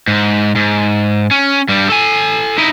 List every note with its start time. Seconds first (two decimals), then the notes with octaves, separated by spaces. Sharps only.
0.08 G#2
0.55 G#2
1.31 C#4
1.69 G2 G3
1.90 A4 G#5
2.58 D#4 E4